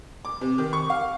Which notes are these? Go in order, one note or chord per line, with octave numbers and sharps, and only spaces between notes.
D6
C3
D#3
C#6
F5